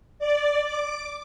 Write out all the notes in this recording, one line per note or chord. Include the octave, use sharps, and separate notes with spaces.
D5
D6